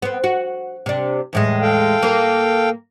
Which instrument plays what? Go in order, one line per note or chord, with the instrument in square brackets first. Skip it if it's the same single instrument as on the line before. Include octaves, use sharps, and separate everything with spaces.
[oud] B3 C4
F#4
C3 D4
E2 A2 G#3
[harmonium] A4 F5 G5
[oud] A#3 A#4